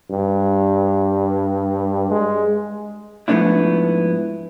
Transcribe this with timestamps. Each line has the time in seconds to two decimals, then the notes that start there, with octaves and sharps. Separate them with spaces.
0.10 G2
2.10 G#3
3.28 G#2 F3 A3 B3 D4 E4